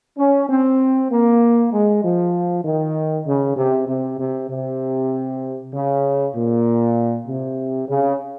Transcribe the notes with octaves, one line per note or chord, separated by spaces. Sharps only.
C#4
C4
A#3
G#3
F3
D#3
C#3
C3
C3
C3
C3
C#3
A#2
C3
C#3